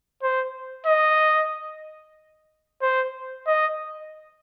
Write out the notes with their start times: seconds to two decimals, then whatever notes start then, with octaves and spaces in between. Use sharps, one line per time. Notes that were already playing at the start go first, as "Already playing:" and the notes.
0.23 C5
0.87 D#5
2.82 C5
3.47 D#5